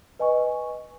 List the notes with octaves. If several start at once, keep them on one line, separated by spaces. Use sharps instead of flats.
B4 D#5 G#5 C#6